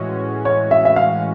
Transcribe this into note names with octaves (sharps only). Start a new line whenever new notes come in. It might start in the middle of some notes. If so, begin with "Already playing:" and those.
Already playing: A2 E3 G#3 C#4 F#4 C#5
C#5
E5
E5
F5